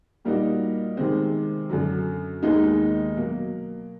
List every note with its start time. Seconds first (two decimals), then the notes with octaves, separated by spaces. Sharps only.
0.25 A#2 G3 A#3 D#4 F#4
0.97 C3 D#3 G#3 C4
1.69 F#2 D3 F#3
2.43 D#2 D#3 G#3 B3 D#4
3.16 B2 F#3 A#3